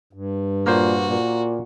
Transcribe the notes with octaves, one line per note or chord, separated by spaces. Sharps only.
G2
A#2 A#3 F#4 C5
A#2